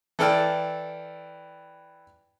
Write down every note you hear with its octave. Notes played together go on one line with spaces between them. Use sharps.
E3 A4 D5 G5 F6